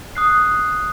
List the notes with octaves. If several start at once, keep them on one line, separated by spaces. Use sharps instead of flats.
D#6 F#6 C7